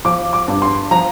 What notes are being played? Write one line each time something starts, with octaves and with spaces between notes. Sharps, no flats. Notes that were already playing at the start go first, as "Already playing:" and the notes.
F3 D6
D6
G2
C6
F3 A#5